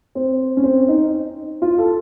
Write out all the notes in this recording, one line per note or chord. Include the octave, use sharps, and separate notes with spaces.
C4
C#4
C4
D#4
F4
A4